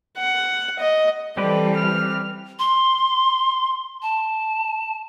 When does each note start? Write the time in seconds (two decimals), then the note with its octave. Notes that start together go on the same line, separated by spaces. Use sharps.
0.17 F#5
0.79 D#5
1.37 E3 G3 C4 G4 A4 B4 D5
1.77 F6
2.59 C6
4.02 A5